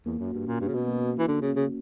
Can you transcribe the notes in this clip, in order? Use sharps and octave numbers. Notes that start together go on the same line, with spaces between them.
E2 A#3
F#2
F#4
G2
A#2 C#4
G2
C#3 F#4
B2
A#3
A#3
E3
D3 A#3
C#3
C#4
C#3